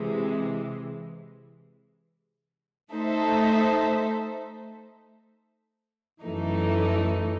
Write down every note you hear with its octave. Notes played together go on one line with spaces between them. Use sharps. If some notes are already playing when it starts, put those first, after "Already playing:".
Already playing: C3 E3 G#3
A3 D#4 A4 C5 E5
F#2 E3 A3 D#4